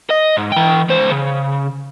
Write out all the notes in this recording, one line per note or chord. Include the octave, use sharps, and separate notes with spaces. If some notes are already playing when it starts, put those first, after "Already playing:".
D#5
G#2
E3 G5
C#2 C5
C#3